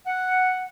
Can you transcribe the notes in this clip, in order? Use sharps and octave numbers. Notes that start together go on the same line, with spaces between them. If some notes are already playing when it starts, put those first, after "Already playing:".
F#5